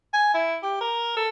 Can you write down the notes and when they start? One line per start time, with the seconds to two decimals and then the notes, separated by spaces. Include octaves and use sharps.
0.14 G#5
0.34 E4
0.63 G4
0.81 A#4
1.17 A4